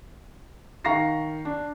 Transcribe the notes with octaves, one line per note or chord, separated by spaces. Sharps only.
D#3 F5 A#5 C#6 A#6 C7
D4